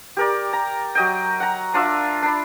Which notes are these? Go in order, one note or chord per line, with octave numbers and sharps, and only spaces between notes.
G4 A#4 D5
A#5
F#3 D#5 G5
F#5 A#5
D4 F4 D5 E5
D4 B5